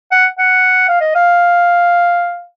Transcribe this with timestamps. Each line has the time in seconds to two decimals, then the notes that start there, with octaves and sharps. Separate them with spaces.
0.12 F#5
0.39 F#5
0.88 F5
1.01 D#5
1.15 F5